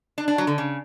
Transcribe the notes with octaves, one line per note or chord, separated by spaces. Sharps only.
D4
D4
F#3
D3
C#3